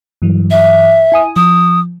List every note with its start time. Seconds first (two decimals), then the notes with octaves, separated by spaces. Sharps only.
0.22 G2 E3 F#3
0.51 E5
1.12 E4 G#5 D#6
1.36 F3 D#6